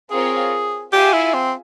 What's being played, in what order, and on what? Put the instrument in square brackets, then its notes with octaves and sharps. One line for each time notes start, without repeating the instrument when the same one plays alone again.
[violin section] C4 F4 A#4 C#5 [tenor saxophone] G#4
[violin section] F4 G#4 E5 G#5 [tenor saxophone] G4
[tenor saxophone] E4
C4